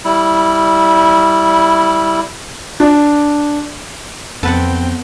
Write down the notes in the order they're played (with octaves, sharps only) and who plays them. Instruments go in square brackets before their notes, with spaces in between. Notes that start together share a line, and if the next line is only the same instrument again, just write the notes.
[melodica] G3 E4
[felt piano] D4
[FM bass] F2 [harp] B3 [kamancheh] C4 G5 [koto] A4 B4 F#5